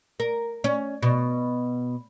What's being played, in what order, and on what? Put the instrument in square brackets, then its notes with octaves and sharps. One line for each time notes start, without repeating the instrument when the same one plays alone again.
[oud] A#4
C#4
B2